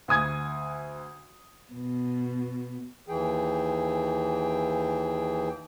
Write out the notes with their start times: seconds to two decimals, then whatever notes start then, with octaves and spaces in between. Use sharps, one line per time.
0.08 D2 G#5 D#6 G#6
1.73 B2
3.08 D#2 E3 G#4 G5